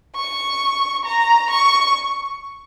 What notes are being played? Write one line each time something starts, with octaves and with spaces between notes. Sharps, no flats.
C#6
A#5
C#6